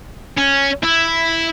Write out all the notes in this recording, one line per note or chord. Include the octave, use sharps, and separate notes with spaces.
C#4
E4